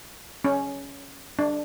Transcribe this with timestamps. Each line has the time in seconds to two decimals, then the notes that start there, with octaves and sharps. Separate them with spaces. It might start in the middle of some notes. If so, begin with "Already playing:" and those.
0.45 C#4
1.39 D4